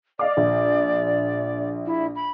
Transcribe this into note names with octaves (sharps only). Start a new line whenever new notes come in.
D5 D#5 F5 D6
A#1
E4
B5